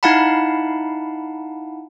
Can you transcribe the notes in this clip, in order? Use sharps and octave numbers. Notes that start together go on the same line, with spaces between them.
D#4 E4 F5 F#5 A5 B5